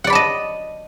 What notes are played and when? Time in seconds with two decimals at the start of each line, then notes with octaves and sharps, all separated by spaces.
0.04 F#5
0.07 D5
0.10 B5
0.13 A5
0.15 D#5